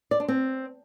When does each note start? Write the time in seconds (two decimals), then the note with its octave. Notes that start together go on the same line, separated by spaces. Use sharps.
0.11 D5
0.20 D4
0.28 C4